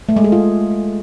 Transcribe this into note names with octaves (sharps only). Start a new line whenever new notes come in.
A3
G#3
G#4
F4